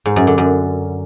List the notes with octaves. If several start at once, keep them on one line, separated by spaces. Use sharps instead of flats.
G#2
F#2
D3
F#2